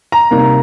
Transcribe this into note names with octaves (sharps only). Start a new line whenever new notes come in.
A#5
C3 G3 A#3 D#4